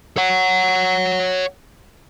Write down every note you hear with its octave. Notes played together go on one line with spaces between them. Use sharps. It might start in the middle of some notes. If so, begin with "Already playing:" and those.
C#5 F#5